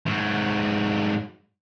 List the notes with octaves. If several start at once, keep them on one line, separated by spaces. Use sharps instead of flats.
G#2 F#3